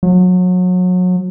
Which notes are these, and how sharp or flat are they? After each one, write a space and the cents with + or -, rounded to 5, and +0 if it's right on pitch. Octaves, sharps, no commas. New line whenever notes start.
F#3 -30